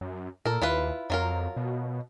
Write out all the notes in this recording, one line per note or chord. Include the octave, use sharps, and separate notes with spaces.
F#2
A#2 A4 A#4
D#2 E4 F4 B4
F2 F#3 F4 A#4
B2